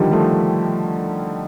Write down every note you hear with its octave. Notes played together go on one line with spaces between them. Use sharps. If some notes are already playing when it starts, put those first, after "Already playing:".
Already playing: D3 D#3 F3 G3
F3 A3